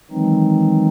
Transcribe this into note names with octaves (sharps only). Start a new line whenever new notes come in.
D#3 E3 F#3 G#3 C4 D#4